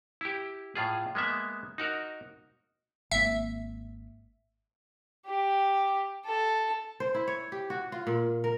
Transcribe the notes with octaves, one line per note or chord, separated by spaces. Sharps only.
E4 G4
A2 F4 G#4
G#3 A#3 B3 E5
D#4 F#4 A#4
G#1 A#3 E5
G4
A4
C5
E4
C#5
G4
F#4
F4
A#2
A#4